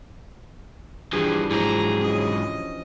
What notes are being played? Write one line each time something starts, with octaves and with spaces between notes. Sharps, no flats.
G2 E3 F3 D4 G4 G#4
G#2 F3 F#3 E4 G#4 A#5
C#4 D#5